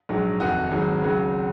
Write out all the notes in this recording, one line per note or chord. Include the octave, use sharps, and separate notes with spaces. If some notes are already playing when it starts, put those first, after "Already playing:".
A#1 G#2 F#3
F1 D#2 D#3 D#4 F#4
G#1 G#2 F#3
C#2 C#3 F#3